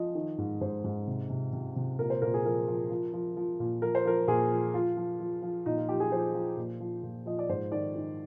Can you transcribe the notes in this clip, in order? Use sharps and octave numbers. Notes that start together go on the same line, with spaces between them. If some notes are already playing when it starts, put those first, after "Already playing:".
Already playing: F3 D#5
D#3
G#2
G#2 C5
G#2
C3
C3
C3
C3
A#2 A#4
C5
A#2 A#4
G#4
F3 A#4
F3
F3
F3
F3
A#2
F3 A#4
C5
F3 A#4
A#2 G#4
F3
F3 F4
F3
F3
F3
A#2 D#4
F4
F3 G4
G#4
F3 C5
F3
A#2
F3
A#2
F3 D#5
D5
G#2 C5
D#3 D5
D#3